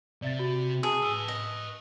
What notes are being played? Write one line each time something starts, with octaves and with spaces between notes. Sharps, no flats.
C3 D5 E5 A6
F#4
G#4 G#5 A5
B4 A5 E6
D#5